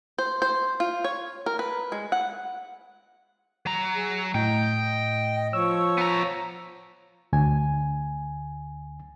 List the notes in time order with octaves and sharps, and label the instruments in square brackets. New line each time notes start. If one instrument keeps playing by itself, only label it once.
[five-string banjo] C5
C5
F4
C#5
A#4
B4
G#3
F#5
[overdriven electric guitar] F#3 A#5
[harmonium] G#4
[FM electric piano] A2 [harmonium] D#5 [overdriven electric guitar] G5
[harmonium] F3 C#5 [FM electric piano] E6
[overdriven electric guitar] B3 A#5
[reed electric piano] D2 G#5